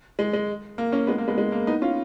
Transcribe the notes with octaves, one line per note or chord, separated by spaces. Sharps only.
G#3
G#3
A#3
A#3 C#4
G#3 B3
A#3
G#3 B3
G#3
A#3
B3 D#4
C#4 F4